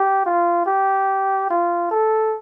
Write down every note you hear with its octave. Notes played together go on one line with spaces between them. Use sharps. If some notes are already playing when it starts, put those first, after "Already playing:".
Already playing: G4
F4
G4
F4
A4